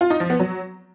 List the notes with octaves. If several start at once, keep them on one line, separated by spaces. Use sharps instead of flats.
F4
D#4
F3
B3
F#3